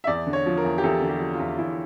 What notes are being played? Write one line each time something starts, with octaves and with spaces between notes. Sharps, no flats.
E5
E2 D5
D3
C#5
F3
A#4
E2
G4
E2 A4
D3
G4
F3
F4
E2
E2 E4